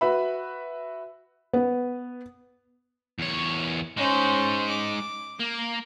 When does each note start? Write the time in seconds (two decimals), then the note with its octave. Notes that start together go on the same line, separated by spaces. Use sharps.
0.01 F#4 B4 E5 B5
1.53 B3 B4
3.19 E2 C#5
3.97 G#3 C#4 D#4 C5
4.69 D6
5.39 A#3